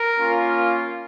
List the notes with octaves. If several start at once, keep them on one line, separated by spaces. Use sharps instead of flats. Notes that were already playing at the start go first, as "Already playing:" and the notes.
Already playing: A#4
A#3 C#4 F4